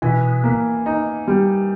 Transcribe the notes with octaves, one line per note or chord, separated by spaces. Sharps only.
B2 E3
A#3
D#4
G3